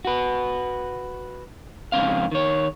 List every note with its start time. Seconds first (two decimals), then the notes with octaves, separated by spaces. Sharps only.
0.05 F#4 B4
1.92 F2 G#2 C#3 C4 F5
2.31 D#3 C#5